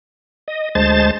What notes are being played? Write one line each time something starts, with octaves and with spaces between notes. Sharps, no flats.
D#5
D2 G#3 C5 A5 A6